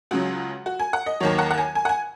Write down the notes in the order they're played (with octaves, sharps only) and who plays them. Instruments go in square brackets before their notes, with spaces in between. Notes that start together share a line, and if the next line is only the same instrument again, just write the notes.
[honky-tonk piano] C#2 C#3 F#3 F#4
F#4
G#5
F#5
D#5
D#2 D#3 F#3 C#5
F#5
F#5
G#5
G#5
F#5
G#5